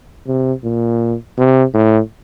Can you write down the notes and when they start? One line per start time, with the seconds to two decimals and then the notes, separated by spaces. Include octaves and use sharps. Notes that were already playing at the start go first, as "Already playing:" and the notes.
0.27 C3
0.63 A#2
1.38 C3
1.74 A2